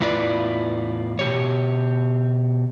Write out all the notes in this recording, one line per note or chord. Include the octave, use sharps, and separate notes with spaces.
E2 A2 E4 F4 B4 D5
B2 G4 C#5